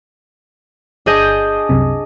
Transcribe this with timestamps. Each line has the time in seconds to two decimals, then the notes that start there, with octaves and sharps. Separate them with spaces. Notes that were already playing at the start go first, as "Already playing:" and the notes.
1.06 G1 D4 G#4 D#5 G6
1.69 C2 F#2 C3